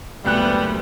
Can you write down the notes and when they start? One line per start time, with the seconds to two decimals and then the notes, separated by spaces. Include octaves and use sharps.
0.24 F#1 D2 G3 B3 F#6